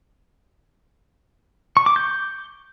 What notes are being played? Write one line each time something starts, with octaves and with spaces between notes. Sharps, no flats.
C#6
D6
G6